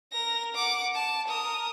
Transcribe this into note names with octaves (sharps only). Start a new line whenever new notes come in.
A#4 A#6
F#5 D6
A5
A#4 D#6